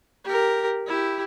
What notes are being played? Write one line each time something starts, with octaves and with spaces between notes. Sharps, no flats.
G4 A#4
E4 G4